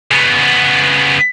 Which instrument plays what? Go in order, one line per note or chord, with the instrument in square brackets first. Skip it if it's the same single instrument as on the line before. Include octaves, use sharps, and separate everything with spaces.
[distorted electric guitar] C#3 B3